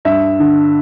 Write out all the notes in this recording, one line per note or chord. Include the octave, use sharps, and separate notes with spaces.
G2 E5
D3